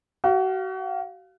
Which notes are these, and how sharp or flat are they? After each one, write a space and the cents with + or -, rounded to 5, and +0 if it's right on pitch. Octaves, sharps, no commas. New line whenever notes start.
F#4 +35 F5 +0